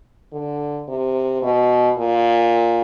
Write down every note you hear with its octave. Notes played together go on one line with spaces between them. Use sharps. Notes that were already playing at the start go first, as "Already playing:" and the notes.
D3
C3
B2
A#2